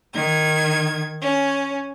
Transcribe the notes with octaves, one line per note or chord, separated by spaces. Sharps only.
D#3 G#6
C#4